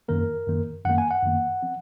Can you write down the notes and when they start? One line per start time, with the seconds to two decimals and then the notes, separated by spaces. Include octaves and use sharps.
0.08 F#2 D#3 A#3 A#4
0.47 F#2 D#3 A#3
0.85 F#2 D#3 A#3 F#5
0.98 G#5
1.11 F#5
1.23 F#2 D#3 A#3
1.63 F3 C4